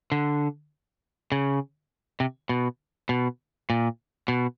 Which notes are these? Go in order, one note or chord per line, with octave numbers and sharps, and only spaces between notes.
D3
C#3
C3
B2
B2
A#2
B2